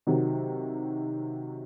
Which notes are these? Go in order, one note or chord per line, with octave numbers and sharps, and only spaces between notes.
C3 D#3 F#3